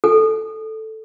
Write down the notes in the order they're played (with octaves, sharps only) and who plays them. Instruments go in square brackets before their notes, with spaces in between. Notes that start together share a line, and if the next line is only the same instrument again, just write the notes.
[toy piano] A4